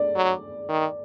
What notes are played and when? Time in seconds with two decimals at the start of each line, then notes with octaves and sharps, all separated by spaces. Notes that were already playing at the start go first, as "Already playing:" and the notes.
Already playing: D5
0.16 F#3
0.69 D#3